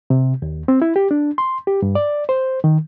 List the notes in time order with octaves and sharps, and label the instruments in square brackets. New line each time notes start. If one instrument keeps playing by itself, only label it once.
[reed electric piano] C3
D#2
C4
E4
G4
D4
C6
G4
G2
D5
C5
D#3